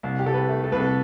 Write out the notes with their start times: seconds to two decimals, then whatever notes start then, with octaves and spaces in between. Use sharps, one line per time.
0.03 C2
0.19 G4
0.26 C2 A4
0.34 B4
0.49 A3
0.64 A4
0.72 C2 B4
0.80 A4